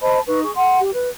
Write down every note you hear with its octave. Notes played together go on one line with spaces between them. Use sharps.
C5 D#5 A5 B5
D#4 B4 C#6
G#4 C#6
F#5 C6
G4
B4